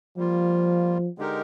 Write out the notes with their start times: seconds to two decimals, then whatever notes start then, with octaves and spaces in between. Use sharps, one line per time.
0.17 F3 G3 A#3 F4
1.18 D3 G#3 D#4 G4 A#4